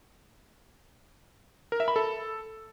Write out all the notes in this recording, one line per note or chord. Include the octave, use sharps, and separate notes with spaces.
A#4
E5
B5
A4